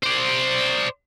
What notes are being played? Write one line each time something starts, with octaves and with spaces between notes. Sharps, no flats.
C5 D5